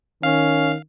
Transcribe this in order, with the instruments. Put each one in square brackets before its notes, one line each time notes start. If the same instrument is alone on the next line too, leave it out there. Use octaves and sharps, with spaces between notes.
[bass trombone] D#3 [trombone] C#4 [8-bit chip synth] F5